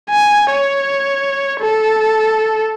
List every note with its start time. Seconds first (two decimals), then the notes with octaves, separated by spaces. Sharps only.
0.10 G#5
0.52 C#5
1.60 A4